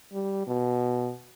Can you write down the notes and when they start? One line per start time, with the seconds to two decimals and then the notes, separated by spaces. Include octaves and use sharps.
0.13 G3
0.47 B2